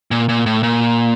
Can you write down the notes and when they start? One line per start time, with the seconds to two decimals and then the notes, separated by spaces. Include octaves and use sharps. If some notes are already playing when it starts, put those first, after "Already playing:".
0.11 A#2
0.29 A#2
0.46 A2
0.63 A#2